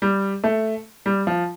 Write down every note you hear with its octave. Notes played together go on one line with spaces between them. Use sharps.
G3
A3
G3
F3